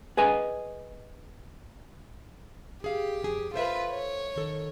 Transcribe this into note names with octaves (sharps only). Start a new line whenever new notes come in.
G#4 B4 D#5 G#5
G4 G#4 F5
F2 G#4
F4 A4 B4 C5 E5
C#5
D#3 A4